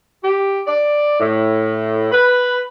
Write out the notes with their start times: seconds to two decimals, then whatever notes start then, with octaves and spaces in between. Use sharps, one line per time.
0.23 G4
0.67 D5
1.20 A2
2.11 B4